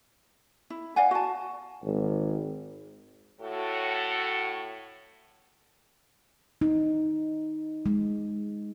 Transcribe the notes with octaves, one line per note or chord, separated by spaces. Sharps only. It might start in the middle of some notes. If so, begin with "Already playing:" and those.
E4
D5 F5 F#5 G#5
F#4 A5
G#1
A2 F#4 A4
D#4
G#3